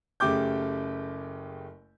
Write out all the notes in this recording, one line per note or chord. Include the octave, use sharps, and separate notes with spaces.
F#1 C#3 A3 G4 D6 G6